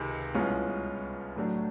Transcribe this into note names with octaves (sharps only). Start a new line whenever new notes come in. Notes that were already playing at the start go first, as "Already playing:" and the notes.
Already playing: C#2 C3 D#3 G#3
C2 B2 G#3 C#4 F4
A2 F#3 A3 D4